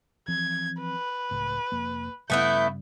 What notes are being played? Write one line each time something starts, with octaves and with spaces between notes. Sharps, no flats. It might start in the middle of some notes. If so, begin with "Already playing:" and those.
E3 F3 C4 G#6
B4
C#2 A2
F1 F2 A#3
G2 C#3 G3 A3 B3 E4 G6